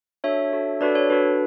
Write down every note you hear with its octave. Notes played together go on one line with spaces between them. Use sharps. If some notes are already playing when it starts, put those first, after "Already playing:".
D4 F#4 A4 C#5 E5
D4 F#4 A4
D4 F#4 A4 B4 D5
C#5
D4 F#4 A4 B4